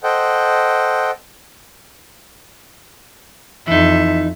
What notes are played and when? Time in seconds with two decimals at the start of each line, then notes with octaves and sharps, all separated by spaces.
0.03 A4 C5 D#5 F#5 G5
3.68 F2 E3 D#4 E5